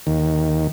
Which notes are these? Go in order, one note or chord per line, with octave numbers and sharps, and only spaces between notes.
D#2